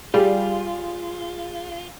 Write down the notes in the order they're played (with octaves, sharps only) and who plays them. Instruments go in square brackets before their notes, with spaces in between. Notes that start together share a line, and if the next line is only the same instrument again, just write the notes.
[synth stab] G3 [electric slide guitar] F4 [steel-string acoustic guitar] G#4